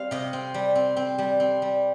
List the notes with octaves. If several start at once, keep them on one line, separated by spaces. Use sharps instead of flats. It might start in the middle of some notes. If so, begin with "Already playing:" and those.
Already playing: G3 C4 F5
C3 D#5
C4
G3
C4
C4
G3
C4
G3